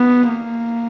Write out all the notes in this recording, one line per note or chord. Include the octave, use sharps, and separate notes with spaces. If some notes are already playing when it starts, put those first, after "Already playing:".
Already playing: B3
A#3